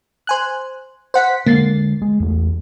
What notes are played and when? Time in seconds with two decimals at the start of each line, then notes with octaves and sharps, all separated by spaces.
0.27 C5 G#5 F#6
1.14 C5 F#5 B6
1.47 D3 G#3 A#3 A6 C7
2.02 G#3
2.20 E2 A3